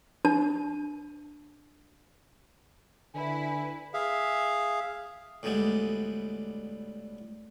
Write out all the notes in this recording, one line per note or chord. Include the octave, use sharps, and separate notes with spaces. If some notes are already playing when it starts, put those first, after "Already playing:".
D4 A5
D3 E4 B4 G#5
G#4 E5 F5
D2 A2 G3 G#3 B3